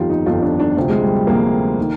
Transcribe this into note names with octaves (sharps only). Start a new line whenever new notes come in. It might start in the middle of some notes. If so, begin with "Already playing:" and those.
Already playing: G1 F2 D#3 F4 G4
D#4
G1 F2 D#3 F4
D4
D4
D2 C3 F3
G#3
G3
D2 C3 F3 A#3
D#3